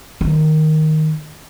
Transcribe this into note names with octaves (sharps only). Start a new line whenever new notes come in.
D#3